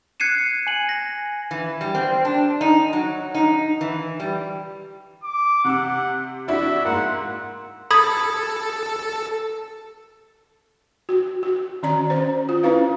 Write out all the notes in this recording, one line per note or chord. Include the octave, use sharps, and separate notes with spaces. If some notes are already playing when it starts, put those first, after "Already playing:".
F#6 G#6 C7 C#7 D#7 E7
G#5 F#7
A#6
E3
G3
C4
D4
D#4
F#3
D#4
E3
G3
D6
C3 F#5 D6 E6
D4 E4 F#4 E5
G#2 A#3 F#5
A4 B5 D#6 G#6
F#4
F#4
D#3 C#4 D5 A#5
C#4 C5
F4
C#4 E4 B4 F5